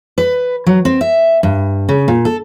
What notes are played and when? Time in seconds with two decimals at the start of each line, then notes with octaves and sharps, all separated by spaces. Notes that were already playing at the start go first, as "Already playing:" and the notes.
0.18 B4
0.67 F#3
0.85 C4
1.01 E5
1.43 G2
1.89 C#3
2.08 A#2
2.25 A4